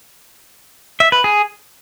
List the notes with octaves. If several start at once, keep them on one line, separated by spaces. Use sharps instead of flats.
E5
B4
G#4